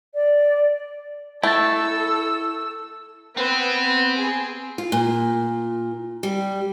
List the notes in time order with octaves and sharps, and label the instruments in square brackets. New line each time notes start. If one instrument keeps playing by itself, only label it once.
[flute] D5
[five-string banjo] A3 [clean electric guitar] E4 A5 [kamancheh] A4 E6
[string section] B3 [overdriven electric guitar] C4
[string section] G#4
[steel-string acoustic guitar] F4
A#2
G3